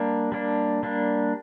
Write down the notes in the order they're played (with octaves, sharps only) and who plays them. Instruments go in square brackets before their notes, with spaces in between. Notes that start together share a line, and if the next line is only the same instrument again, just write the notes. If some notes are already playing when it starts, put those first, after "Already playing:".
Already playing: [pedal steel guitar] G3 A#3 D4
G3 A#3 D4
G3 A#3 D4